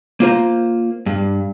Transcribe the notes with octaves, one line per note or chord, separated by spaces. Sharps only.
A#3 F4 C5 A#5
G2